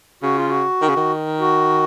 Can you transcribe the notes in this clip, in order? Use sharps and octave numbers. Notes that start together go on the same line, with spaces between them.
C#3 F#4
F4
F#4
D#3
C#3
D#3
F#4